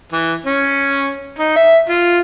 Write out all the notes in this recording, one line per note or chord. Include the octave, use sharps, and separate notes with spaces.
E3
C#4
D#4
E5
F4